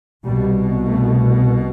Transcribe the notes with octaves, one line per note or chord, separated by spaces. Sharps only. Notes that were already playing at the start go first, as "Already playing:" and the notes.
C2 B2 G3
A3